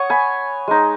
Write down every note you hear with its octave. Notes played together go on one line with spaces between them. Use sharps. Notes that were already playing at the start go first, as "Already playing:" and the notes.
Already playing: C#5 F#5 C#6 D#6
G#5 B5
G#3 D#4